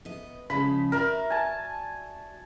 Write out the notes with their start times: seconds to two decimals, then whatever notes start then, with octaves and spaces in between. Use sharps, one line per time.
0.05 B3 D#5
0.50 C#3 F3 G#3 B5
0.92 F#4 A#4 D5 E5
1.30 G#5 A5